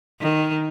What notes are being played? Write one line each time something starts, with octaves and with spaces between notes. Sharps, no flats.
D#3